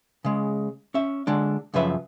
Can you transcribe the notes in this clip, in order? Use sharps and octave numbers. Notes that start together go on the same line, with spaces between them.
C#3 G#3
C#4 E5
D3 G#3 D4
F#2 C#3 F3 B4 E5